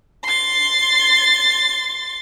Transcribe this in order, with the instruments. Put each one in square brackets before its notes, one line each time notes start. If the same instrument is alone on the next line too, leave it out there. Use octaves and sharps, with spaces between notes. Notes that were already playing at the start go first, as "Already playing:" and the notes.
[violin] C6 A6